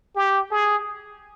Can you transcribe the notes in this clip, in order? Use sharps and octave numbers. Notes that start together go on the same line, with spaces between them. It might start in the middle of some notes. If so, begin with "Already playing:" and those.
G4
G#4